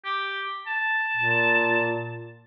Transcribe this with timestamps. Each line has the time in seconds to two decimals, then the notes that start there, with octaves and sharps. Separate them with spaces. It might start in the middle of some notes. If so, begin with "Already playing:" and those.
0.05 G4
0.67 A5
1.17 A#2